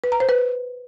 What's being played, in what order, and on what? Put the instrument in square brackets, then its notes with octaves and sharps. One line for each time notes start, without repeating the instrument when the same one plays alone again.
[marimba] B4
A#5
C5
B4